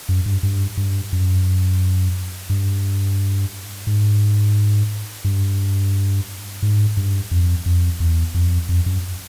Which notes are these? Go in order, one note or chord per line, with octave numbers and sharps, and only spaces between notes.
F#2
G2
G2
G2
F#2
G2
G#2
G2
G#2
G2
F2
F2
E2
F2
F2
F#2